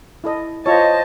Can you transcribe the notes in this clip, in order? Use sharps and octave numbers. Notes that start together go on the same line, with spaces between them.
E4 A4 D#5
F4 C5 C#5 D#5 A5